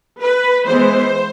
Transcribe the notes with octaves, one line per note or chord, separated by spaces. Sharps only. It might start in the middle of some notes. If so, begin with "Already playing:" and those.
B4
E3 G#3 B3 C5